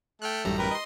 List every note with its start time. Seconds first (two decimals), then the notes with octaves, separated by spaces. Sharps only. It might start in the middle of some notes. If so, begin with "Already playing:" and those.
0.22 A3 G5 F6 F#6
0.45 A1 F#2 D#3 G3 A#5
0.59 G4 A#4 B4
0.71 D#5 C6